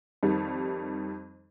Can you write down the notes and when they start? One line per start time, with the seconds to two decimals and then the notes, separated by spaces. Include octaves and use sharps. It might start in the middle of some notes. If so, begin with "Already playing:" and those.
0.23 F2 D#3 G3